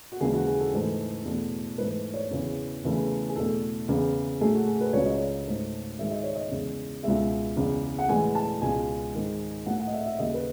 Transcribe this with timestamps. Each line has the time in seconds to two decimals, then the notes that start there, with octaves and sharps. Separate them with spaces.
0.12 F#4
0.20 D#2 C#3 E3 G#3 G#4
0.33 F#4
0.47 G#4
0.60 A4
0.73 G#2 E3 A3
1.25 E2 B2 A3
1.78 G#2 E3 A3 B4
2.14 C#5
2.30 E2 C#3 E3
2.83 E2 C#3 E3 A3
3.29 G#4
3.36 E2 B2 A3 A4
3.88 E2 C#3 E3
4.41 A2 F#3 A3 G#4
4.55 F#4
4.67 G#4
4.81 B4
4.93 C#2 C#3 F#3 C#5
5.05 D#5
5.17 C#5
5.46 G#2 F#3 A3
5.99 G#2 D#3 G#3 E5
6.11 D#5
6.23 C#5
6.35 D#5
6.51 E2 C#3 G#3
7.03 C#2 B2 G#3 E5
7.56 E2 C#3 G#3
7.99 F#5
8.09 A2 E3 G#3 G#5
8.35 A5
8.61 C#2 B2 G#3 G#5
9.14 G#2 D#3 G#3
9.66 A2 F#3 A3 F#5
9.79 F#5
9.87 D#5
9.92 E5
10.06 E5
10.19 D#2 C#3 F#3 D#5
10.34 B4